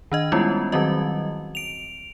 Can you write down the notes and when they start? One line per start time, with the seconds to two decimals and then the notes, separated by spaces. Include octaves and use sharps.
0.12 D#3 D4 D#5
0.32 G3 G#3 B3 C#4 E4 F4
0.72 D#3 F#3 G3 C4 F#4 D#5
1.55 D7 F7